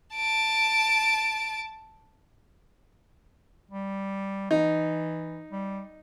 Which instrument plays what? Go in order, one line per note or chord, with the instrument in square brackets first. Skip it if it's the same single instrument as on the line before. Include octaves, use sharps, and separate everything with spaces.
[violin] A5 D7
[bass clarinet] G3
[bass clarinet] E3 [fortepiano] D#4
[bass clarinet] G3